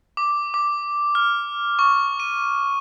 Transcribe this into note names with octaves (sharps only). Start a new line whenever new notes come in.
D6
D6
F6
C#6
D#7